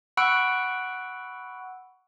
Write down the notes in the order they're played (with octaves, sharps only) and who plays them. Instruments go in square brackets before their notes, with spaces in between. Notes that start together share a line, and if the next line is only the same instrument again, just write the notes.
[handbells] F#5 B5 C#6 E6 F#6 D7